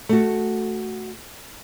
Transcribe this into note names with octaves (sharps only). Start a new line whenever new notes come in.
A3 F#4